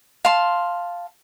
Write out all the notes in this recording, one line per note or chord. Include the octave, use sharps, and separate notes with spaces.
F5 A5 C6